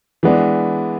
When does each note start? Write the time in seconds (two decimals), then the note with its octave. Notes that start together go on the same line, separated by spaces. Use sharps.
0.23 E3 G#3 B3 D4